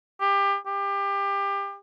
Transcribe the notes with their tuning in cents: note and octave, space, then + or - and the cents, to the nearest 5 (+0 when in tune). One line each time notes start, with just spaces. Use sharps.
G4 +25
G4 +25